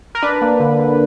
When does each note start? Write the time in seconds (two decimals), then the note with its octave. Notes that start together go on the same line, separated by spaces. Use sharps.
0.15 A#4
0.22 D4 B4
0.41 A#3
0.60 D3
0.79 D3